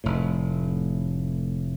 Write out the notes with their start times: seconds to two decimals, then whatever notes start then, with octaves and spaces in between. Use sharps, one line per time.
0.04 F1 A2